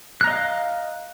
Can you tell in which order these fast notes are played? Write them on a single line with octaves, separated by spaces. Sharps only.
F#6 A#5 D#5 F5